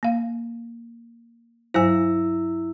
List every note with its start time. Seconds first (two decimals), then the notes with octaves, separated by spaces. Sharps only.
0.03 A#3 F5
1.74 G2 F#3 E4 C5 E6